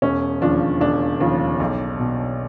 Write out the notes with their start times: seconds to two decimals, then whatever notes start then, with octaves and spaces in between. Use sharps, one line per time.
0.02 E1 C#4
0.41 D#2 C#3 F3 D4
0.81 E1 D4
1.20 D#2 C#3 F3
1.60 B1
2.00 B2